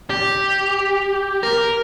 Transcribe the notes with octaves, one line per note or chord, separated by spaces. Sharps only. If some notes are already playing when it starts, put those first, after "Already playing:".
G4
A#4